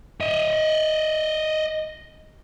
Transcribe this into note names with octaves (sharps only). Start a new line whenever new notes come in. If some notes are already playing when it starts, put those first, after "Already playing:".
D#5 E5